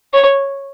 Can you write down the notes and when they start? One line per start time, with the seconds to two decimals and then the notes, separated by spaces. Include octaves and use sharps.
0.13 C#5